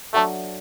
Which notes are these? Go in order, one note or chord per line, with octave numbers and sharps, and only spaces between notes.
F#3 A3 D4 F#4 A4 E5